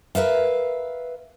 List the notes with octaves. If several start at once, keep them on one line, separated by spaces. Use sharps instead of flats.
A#4 B4 E5 F5